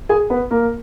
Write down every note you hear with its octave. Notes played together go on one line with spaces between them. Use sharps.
G#4 G#5
B3 B4
A#3 A#4